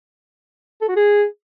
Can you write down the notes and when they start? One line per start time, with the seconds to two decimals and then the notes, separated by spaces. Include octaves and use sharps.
0.81 A4
0.89 F#4
0.96 G#4